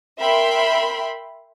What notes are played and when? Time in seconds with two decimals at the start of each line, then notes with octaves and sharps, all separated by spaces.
0.19 A#4 E5 G5 B5 C6